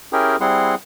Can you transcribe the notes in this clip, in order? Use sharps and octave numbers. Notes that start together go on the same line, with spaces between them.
C#4 E4 G4 G#4 A#4 G5
G3 C4 E4 G#4 F#5 C6